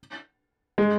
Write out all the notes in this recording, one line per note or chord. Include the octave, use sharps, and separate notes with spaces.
G#3